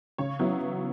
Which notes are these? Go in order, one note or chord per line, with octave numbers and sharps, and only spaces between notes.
C#3 C#5
F#3 B3 E4